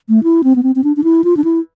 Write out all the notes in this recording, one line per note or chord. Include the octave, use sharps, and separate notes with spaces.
A3
E4
C4
B3
C4
C4
D4
D4
E4
F4
D4
E4